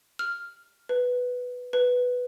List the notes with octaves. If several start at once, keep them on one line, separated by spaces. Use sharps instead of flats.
F6
B4
B4